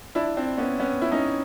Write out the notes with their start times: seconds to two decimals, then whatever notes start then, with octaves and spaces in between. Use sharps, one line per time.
0.15 D4 E4
0.37 C4 D4
0.58 B3 C#4
0.80 B3 C#4
1.02 E4
1.11 C#4 D#4